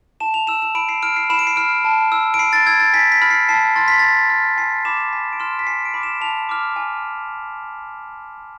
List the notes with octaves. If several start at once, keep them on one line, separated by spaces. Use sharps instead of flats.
A5 E7
F7
E6 E7
E7
B5 D7
C7
F6 D7
C7
B5 E7
D7
C7
F6 D7
A5
E6
D7
B5 C7
A6
E6 G#6
A6
G#5 B6
B6
B5 F6
C7
A5 C7
C6 F6 A6
B6
B5 A6
F6
G#5 C7
B5 D6 E7
G#5 B6
D7
C6 F6 E7
B6
G#5 C7
D7
B5 D6 F6
E7
A5 F7
D6 F6
G#5